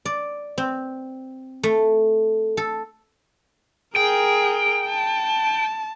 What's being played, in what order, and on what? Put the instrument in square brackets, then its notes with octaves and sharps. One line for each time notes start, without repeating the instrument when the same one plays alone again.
[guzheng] D5
C4
A3
A4
[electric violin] G#4 A#4 [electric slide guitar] G5
[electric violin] A5